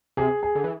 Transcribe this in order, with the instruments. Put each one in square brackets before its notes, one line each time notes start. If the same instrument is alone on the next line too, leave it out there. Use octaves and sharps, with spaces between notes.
[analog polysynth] C3 [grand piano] G#4
[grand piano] G#4
[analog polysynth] D3
E3